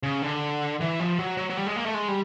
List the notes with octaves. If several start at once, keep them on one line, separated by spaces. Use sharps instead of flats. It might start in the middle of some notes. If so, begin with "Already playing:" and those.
C#3
D3
E3
F3
F#3
F#3
F#3
G3
G#3
A#3
A3
G#3
G3